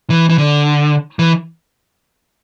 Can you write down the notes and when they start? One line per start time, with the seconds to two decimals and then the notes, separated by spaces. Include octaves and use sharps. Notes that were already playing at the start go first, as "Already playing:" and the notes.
0.10 E3
0.29 E3
0.38 D3
1.19 E3